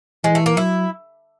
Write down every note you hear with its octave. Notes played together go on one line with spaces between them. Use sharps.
E3 G#3
A3
A#3
F#3 E4